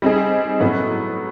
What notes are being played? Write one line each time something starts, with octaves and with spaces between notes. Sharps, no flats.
G3 C4 D#4 G#4
A2 F#3 B3